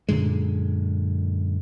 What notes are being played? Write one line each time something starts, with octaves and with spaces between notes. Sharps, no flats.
F#2 A#2 D3 G#3